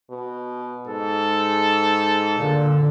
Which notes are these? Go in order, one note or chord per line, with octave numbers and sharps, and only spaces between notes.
B2
G#2 A4
A#2 D3